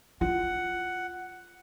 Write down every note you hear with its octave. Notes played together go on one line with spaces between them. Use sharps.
F4 F#5